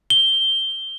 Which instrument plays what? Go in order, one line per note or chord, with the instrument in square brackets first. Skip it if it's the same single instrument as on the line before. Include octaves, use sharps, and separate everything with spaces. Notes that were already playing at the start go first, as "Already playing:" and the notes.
[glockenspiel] G7